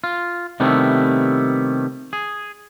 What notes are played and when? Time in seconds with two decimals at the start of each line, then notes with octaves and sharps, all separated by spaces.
0.04 F4
0.60 C3 D#3 G3 A3 B3 E4
2.13 G#4